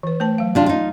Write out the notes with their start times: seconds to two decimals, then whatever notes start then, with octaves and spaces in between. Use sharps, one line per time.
0.03 E3 B4
0.20 A3 C5 A5
0.38 F#3 F5
0.55 C3 D4 F4
0.66 D#4 F4